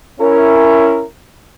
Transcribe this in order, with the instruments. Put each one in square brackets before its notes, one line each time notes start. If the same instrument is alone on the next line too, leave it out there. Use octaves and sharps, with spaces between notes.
[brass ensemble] C#4 E4 A#4